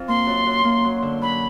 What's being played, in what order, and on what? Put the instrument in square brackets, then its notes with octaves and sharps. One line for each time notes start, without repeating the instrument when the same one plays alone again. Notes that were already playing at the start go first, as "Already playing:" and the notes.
Already playing: [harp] F2
[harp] A#3 [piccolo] C6
[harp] F#2
F#2
A#3
F#3
D3
[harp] F#3 [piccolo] B5